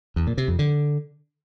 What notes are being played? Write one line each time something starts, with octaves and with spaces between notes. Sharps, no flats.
E2
A#2
C3
F2
D3